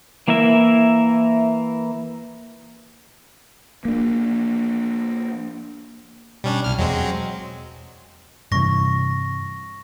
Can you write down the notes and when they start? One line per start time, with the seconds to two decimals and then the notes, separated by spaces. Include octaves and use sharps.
0.28 E3 A#3 E4 A#4 E5
3.85 A#3 D4
6.44 B2 G3 C#4 D4
6.64 C2 F6
6.78 E2 F#3 G#3 C4
8.52 G2 C3 E3 C#6 A#6